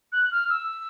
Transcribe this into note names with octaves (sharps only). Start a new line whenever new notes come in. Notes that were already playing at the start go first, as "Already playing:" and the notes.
F#6
F6
E6